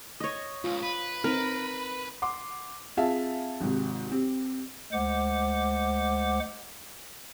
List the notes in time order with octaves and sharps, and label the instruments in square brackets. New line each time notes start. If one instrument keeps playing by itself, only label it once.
[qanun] C#5 D#5
[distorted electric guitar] C#2 [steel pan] F4
[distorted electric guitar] B4
[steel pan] C4 D#4 [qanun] A#4
[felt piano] F#5 C6 D6
C4 F4 G#4 E5 F5 A5
G#1 G#2 C3
C4 G4
[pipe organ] D2 G#3 C5 F#5 D6